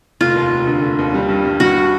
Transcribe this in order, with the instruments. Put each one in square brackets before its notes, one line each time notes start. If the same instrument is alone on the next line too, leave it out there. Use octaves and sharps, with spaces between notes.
[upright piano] F1 [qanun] F4
[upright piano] D#2
F1
D3
F1
D#2
G3
G2
G2
[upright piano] G2 [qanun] F#4